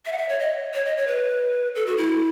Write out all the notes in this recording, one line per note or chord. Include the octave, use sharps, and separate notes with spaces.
E5
F#5
E5
C#5
D#5
C#5
D#5
C#5
B4
A4
F#4
E4